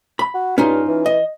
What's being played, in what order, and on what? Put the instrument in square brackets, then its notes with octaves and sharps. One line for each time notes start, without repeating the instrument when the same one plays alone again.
[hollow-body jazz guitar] B5
[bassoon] F#4
[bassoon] G2 [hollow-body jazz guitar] C#4 D#4 F4
[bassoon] E3
[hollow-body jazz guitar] D#5